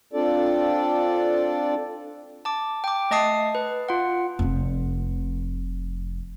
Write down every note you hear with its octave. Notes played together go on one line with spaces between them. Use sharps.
C4 D4 F4 A4 D5
A5 D6
G5 D6
A3 D#5 A5 D#6 C7
B4
F4 F#5
F1 F2